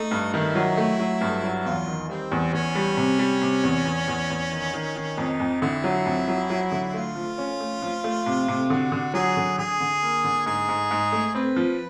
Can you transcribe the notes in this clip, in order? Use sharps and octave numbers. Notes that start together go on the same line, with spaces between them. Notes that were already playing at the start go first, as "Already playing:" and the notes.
Already playing: A3 D#4
G2
D#3 E4
F#3
A3
F#3
G2
F#3
E2 F4
D#3
G3 C4
E2
E2 C#4
G3
C3
G3
C3
E2
E2
E2
E2
D#3
D#3
D#3
F2 D#4
F2
D3 E4
F#3
F2
F#3
F#3
D3
A3 F4
F3
C#4
A3
F3
A3
C3
C3
D3 F#4
D3
F#3 G#4
D3
D3 G#4
D3
A#3
D3
G#2 G#4
G#2
G#2
A3
C4 B4
F3